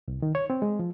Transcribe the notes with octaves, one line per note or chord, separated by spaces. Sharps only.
C2
D#3
C#5
C4
G#3
F3